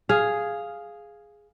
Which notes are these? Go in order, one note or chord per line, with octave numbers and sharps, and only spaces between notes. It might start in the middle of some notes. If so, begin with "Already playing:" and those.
G#4 F5